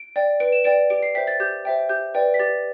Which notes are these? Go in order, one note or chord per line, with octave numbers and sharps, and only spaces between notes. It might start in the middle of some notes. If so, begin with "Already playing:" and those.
Already playing: D7
D5 G5
B4 D7
E7
D5 G5 D7
G4 D7
C7
C5 E5 G5 B6
A6
G4 G6
C5 E5 G5
G4 G6
B4 D5 G5
B6
G4 A6